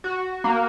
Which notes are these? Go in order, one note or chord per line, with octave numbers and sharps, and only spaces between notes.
F#4
A#3